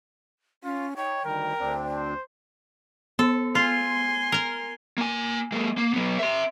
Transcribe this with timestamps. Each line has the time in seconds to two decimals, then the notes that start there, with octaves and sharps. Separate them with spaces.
0.64 C#4 F4
0.97 D#4 C#5 G5
1.25 D2 D#3 G3 A#4
1.59 D2 C4 D4
1.94 C5
3.19 B3 A4
3.55 F4 G#5 C6
4.32 A#4 A#5
4.98 A#3 G#5
5.52 G#3 A#3
5.77 A#3
5.93 F#3 B3
6.19 E5 C6